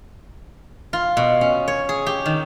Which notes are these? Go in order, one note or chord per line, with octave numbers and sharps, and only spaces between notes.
F4
B2
C#4
C#5
G#4
G4
D#3